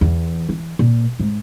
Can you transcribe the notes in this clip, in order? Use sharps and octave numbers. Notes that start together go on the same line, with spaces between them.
E2
E3
A#2
G#2